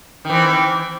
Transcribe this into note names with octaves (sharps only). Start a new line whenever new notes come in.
D#3 E3 C4